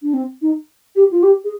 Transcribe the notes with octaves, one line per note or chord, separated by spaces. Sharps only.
D4
C4
D#4
G4
F4
G4
G#4